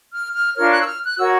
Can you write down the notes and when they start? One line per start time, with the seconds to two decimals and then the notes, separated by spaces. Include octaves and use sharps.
0.13 F6
0.34 F6
0.54 D4 F4 A#4 C#5 F6
0.70 F#6
0.80 E6
0.86 F6
1.02 F#6
1.18 F#4 A#4 C#5 E6